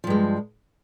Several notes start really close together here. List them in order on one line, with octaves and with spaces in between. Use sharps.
F3 G2 G#3